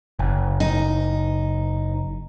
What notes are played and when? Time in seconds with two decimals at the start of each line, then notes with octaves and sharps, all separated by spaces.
0.19 F#1
0.60 D#4